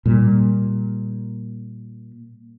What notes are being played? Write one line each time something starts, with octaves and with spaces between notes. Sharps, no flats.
A#2 G3